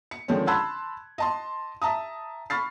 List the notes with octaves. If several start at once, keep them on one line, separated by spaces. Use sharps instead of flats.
C#7
D3 D#3 F3 G#3 C4 C#4
A5 B5 C6 E6 F#6 G#6
D#5 A5 C6
E5 A5 A#5 D#6
B5 C#6 F6 A6 C7